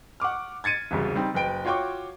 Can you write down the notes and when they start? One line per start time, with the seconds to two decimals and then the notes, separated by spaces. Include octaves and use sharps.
0.20 F#5 C#6 D6 F6
0.64 G#6 A6 C#7 D#7
0.91 E1 C2 C#3
1.15 G3 C4 D#4
1.34 F#1 B4 G5 D7
1.65 F4 F#4 C#5 G5 C#6 D6